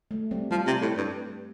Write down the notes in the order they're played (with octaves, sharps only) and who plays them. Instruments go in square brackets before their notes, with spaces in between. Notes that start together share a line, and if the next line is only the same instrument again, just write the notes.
[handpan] A3
G3 C4
[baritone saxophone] F3 [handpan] G3
[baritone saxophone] C3
A2
G2